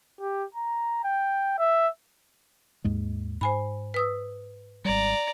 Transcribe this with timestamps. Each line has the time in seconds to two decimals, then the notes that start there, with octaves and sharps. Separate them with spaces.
0.21 G4
0.55 A#5
1.04 G5
1.58 E5
2.84 D#2 G#2 G#3
3.41 G#2 C5 G#5 B5
3.94 B4 D#6 E6
4.85 G#1 G3 D5 A#5